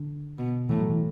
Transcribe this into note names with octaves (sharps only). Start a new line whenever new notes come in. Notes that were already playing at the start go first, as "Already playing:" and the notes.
Already playing: D3
B2
A2 E3
F#3
E3